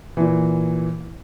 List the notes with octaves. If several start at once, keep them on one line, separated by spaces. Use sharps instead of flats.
A#2 E3